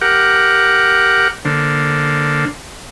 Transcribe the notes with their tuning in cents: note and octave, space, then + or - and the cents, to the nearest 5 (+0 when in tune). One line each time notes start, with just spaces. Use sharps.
G4 +0 A#4 +0 F#5 +0
D3 +0 A#3 +0 C5 +0